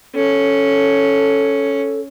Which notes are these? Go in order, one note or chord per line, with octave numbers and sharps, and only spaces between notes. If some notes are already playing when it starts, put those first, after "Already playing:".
C#4 A4